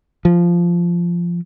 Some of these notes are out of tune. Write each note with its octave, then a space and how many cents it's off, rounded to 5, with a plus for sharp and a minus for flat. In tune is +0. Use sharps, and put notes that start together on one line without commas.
F3 -10